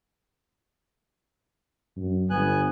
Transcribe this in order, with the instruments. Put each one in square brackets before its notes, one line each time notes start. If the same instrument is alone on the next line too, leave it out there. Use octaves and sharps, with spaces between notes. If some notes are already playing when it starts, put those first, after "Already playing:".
[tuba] F#2
[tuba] G1 [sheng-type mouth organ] B3 G#5 F#6